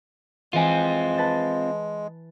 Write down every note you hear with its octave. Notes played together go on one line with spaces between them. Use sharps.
E3 G#3 C4 F4 G#5
B4 A5 A6